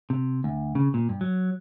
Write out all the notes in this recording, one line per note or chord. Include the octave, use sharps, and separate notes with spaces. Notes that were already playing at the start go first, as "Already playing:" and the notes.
C3
D2
C#3
A#2
G2
F#3